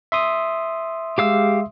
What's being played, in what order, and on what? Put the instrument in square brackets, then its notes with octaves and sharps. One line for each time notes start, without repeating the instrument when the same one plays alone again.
[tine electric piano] E5 C6 D#6
[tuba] G#3 [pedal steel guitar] G4 F5 E6